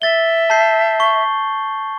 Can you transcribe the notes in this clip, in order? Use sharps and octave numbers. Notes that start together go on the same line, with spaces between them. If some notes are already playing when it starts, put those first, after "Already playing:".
E5 A6 G7
A5 G6 C7
C#6 G7